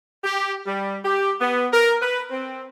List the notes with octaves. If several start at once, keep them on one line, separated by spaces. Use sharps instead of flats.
G4
G3
G4
B3
A#4
B4
C4